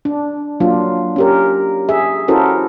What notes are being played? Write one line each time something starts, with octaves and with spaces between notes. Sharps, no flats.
D4
F#3 A#3 D4 F4
C#4 G4 A#4
G#4 E5
C#4 E4 F#4 A4 A#4 C5